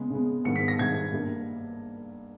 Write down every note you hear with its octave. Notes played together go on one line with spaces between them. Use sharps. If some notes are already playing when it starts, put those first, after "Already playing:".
Already playing: C#3 G#3 B3
C#3 G#3 B3
G#2 D#3 G3 B3 C#7
B6
A#6
G#2 D#3 G3 B3 G#6
G2 G3 A#3